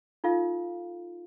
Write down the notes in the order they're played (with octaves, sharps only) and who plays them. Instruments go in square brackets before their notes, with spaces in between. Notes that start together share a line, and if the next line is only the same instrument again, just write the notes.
[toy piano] D#4 F4 A4 F5